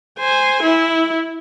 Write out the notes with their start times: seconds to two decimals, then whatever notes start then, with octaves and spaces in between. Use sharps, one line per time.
0.19 C5 G#5
0.63 E4